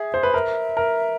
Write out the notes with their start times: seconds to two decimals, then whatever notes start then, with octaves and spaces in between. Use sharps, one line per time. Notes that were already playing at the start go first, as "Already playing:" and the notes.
Already playing: G#4 E5
0.14 C5
0.23 B4
0.34 A#4 E5
0.77 A#4